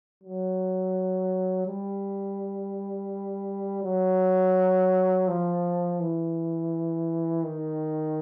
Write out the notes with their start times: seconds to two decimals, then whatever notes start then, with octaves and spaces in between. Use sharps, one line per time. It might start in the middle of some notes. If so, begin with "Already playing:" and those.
0.24 F#3
1.67 G3
3.83 F#3
5.28 F3
6.00 E3
7.44 D#3